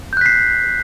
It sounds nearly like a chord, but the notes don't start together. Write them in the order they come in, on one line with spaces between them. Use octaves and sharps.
G6 F#6 B6 C7